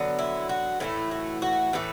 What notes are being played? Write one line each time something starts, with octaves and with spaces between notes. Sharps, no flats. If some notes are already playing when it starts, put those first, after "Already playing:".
Already playing: D3 F#3 B3
E4
F#4
A2 E3 A3 E4
F#4
F#4
A2 E3 A3 B4